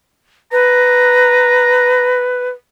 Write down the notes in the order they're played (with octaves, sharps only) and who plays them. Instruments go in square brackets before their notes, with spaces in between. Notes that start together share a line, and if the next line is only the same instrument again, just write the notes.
[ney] B4 [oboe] A#5